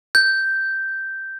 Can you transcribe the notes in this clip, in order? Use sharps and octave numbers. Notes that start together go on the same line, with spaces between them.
G6